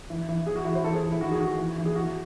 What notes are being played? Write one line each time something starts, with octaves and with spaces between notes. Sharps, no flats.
E3
E3
E3 G#4
F#4
E3 E4
C5
E3 A4
G#4
E3
E4
D#3 F#4
G#4
D#3 F#4
E3
E3
G#4
E3 F#4